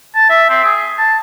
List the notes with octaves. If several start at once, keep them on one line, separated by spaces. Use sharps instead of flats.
A5
E5
C4
G#4
A5